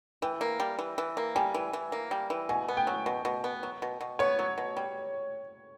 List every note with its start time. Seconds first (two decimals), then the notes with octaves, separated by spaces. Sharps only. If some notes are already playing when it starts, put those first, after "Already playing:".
0.22 E3 G5
0.41 A#3
0.60 G3
0.79 E3
0.98 E3
1.17 A#3
1.35 G3 G#5
1.54 E3
1.73 E3
1.92 A#3
2.11 G3
2.30 E3
2.49 B2 G#5
2.68 B3
2.77 G5
2.87 F#3
3.06 B2
3.25 B2
3.44 B3
3.63 F#3
3.82 B2
4.01 B2
4.19 B3 C#5
4.39 F#3
4.58 B2
4.77 G3